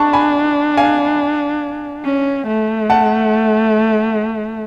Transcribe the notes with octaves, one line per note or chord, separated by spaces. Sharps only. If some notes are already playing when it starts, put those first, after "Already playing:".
Already playing: D4 A5 C#6
G#5 B5
F5 G#5
C#4
A3
F#5 A5